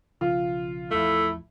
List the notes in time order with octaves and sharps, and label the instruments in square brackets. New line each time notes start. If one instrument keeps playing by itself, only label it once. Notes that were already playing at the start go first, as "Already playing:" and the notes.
[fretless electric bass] B1 C#3 F3 [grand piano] F4
[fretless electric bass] A1 E2 F3 [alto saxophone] A3 [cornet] E4